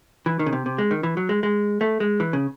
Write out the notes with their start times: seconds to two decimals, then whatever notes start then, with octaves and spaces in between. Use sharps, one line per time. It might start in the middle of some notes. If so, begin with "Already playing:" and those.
0.26 E3
0.39 D#3
0.46 C#3
0.53 C3
0.66 C3
0.78 G#3
0.91 D#3
1.03 E3
1.17 F#3
1.29 G#3
1.43 G#3
1.81 A3
2.00 G#3
2.20 E3
2.33 C#3